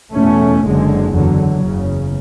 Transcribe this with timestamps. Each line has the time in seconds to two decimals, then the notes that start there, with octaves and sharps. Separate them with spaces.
0.14 E2 B2 A3 C#4
0.63 F#1 F#2 D3 G#3
1.12 E2 D3 F#3
1.62 F#1 E2 C#3